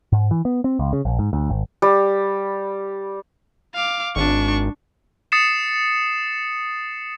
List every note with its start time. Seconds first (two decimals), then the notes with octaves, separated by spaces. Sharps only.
0.12 G#2
0.31 E3
0.45 B3
0.64 C4
0.79 C#2
0.93 C#3
1.05 A#1
1.19 G#2
1.33 D2
1.50 G#1
1.82 G3
3.75 F5 D6
4.16 G#1 D4 C#6
5.32 D#6 A6 C7 C#7 E7